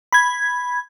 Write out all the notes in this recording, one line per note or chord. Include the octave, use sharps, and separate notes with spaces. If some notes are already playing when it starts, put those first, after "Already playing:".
B5 G#6